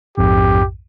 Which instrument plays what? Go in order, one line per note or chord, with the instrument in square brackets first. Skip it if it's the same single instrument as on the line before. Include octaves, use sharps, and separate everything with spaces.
[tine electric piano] A#1 F2 G#2 [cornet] G4